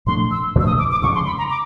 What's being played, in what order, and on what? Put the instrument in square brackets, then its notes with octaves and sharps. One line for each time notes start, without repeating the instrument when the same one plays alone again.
[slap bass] A#2 F3 A3 D4 [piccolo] C6
[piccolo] E6
[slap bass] A#2 F3 A3 D4 [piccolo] E6
[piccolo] D#6
D6
D6
[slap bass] D2 C#3 F3 G#3 [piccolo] C#6
[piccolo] C6
B5
A#5
D6